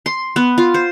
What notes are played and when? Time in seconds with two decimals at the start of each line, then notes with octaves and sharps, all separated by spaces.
0.06 C6
0.36 B3
0.58 F4
0.74 C5